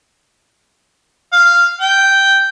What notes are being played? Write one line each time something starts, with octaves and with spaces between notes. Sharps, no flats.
F5
G5